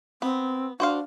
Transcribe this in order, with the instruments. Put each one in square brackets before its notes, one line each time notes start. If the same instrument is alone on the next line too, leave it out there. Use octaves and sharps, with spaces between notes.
[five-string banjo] B3 [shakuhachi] C4
[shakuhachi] D4 [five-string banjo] F#4 C5 F5